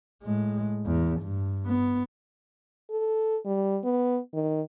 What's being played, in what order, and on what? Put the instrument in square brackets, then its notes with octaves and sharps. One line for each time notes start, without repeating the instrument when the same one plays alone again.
[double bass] A2 G#3
E2
G2
B3
[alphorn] A4
G3
B3
D#3